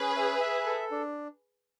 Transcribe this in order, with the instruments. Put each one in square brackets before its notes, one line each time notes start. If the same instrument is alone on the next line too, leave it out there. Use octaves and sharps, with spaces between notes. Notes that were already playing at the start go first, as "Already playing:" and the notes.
Already playing: [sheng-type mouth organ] C#4 [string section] G#4 B4
[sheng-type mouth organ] E5
E5
A4
D4